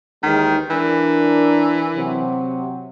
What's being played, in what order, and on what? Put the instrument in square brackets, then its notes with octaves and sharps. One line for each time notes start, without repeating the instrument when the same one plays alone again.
[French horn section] D#2 E3 G#3 [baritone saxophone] D#3
[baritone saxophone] E3 [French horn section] D4 A#4
[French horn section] C3 F#3